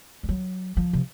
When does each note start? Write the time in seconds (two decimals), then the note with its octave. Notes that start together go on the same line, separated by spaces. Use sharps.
0.23 G3
0.29 F#3
0.77 F3
0.93 C3